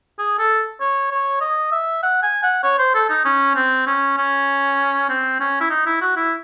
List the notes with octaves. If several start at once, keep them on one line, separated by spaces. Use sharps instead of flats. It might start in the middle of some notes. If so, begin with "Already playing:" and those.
G#4
A4
C#5
C#5
D#5
E5
F#5
G#5
F#5
C#5
C5
A4
D#4
C#4
C4
C#4
C#4
C4
C#4
E4
D#4
E4
F#4
E4